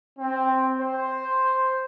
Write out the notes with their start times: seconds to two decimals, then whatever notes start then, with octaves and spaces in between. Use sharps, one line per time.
0.19 C4
0.80 C5